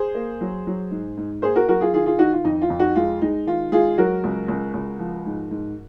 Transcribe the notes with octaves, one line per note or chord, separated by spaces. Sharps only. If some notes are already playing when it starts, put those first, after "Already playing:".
Already playing: G#4 C5
A#3
F#3
F#3
G#2
G#2
A#3 G#4 C5
F#4 A#4
F#3 F#4 A#4
F4 G#4
D#3 F4 G#4
F4 G#4
D#3 D#4 F#4
F4
F2 D#4
F4
F2
D#4 F#4
G#3 F4
G#3 D#4
D#3 F4
G#3 F4 G#4
F#3 F#4 A#4
C#2
C#2
C#2
F3
G#2
G#2